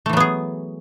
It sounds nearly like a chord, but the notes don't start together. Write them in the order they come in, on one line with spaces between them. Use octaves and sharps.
A3 E3 F#3 B3 G#4